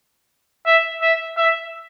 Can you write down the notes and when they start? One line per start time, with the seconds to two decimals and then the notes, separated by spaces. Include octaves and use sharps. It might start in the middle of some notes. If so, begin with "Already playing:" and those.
0.66 E5
1.02 E5
1.37 E5